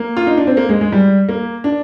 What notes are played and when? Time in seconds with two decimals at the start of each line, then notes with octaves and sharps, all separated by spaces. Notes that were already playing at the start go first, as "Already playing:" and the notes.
Already playing: A#3
0.17 F4
0.27 D#4
0.37 D4
0.47 C4
0.57 A#3
0.69 G#3
0.81 G#3
0.92 G3
1.29 A#3
1.64 D4